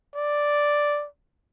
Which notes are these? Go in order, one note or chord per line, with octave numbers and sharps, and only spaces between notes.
D5